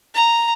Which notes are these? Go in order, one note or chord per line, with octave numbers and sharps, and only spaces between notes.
A#5